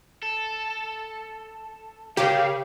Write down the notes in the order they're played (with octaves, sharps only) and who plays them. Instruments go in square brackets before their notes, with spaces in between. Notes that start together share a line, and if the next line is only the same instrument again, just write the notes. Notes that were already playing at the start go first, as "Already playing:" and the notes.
[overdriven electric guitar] A4
[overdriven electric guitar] C#3 [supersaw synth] G4 [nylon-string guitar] A#4 C#5 [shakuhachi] F5